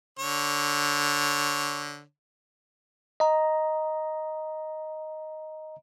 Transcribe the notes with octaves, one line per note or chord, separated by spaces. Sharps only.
D3 C#5
D#5 A#5